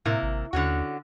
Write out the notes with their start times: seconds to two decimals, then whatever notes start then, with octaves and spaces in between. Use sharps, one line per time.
0.05 A2 C3 A#3 E4
0.22 G#1
0.53 D#2 D3 C#4 F#4